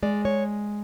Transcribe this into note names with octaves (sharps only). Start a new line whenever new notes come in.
G#3 D5
C#5